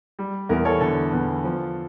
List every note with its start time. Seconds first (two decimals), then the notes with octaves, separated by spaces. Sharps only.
0.19 G3
0.49 E2 A#4
0.65 A4 C#5
0.81 D3 A4
1.13 E2
1.44 F3